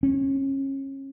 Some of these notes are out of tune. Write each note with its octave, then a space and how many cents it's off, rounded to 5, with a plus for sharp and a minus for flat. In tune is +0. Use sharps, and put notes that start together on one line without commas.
C#4 -30